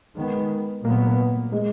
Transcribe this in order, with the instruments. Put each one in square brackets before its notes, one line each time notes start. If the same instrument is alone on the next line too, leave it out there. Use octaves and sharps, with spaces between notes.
[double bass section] D#3 G#3 B3
[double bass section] A#2 F#3 B3 [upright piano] A#3
[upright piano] G#3